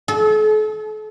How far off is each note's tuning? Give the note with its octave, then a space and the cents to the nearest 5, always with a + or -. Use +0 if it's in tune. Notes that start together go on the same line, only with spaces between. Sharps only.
A4 -40